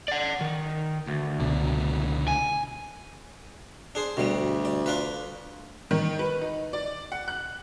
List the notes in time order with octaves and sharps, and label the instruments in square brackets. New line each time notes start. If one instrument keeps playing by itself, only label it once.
[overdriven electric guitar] D5 F#5
D#3
D2
[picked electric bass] C#2 B2 D3
[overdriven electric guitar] G#5
[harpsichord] D4 G#4 C5
[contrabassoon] D2 [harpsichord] B2 G3
[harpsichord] D5
D4 F4 B4
[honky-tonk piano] D#3
B4
D#4
D5
F#5
F#6